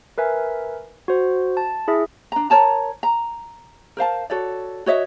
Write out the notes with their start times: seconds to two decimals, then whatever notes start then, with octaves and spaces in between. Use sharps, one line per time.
0.18 A#4 B4 E5 G#5
1.08 F#4 C5
1.57 A5
1.88 E4 G#4 E5
2.32 D4 A#5
2.50 A#4 C#5 A5 A#5
3.03 A#5
3.97 A#4 C5 F5 A5
4.30 F#4 A4 C#5 D5
4.86 F#4 C#5 D#5 E5